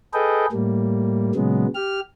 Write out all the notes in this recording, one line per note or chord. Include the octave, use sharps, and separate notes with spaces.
G#4 A4 B4 D#5 G5
A2 G3 A#3
A#2 C#3 F#3 G#3 B3
G4 F6